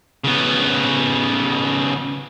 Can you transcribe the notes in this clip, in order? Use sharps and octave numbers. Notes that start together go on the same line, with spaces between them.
C#3 B3